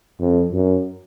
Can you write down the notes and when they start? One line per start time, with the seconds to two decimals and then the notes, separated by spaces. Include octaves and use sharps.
0.20 F2
0.52 F#2